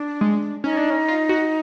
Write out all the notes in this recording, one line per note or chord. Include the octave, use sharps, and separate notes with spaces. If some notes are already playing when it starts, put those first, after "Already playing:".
Already playing: D4
G#3
C#4 D#4
D4
C#4
F4
F#4